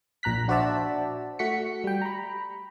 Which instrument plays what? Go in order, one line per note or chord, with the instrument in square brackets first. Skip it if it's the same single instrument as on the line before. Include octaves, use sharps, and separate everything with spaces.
[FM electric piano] A#1 A#2 A#5 F#6 B6
D4 F#4 C5 D5 E5 A5
A3 F#4 B6 C#7
G3 G5
A#5 B5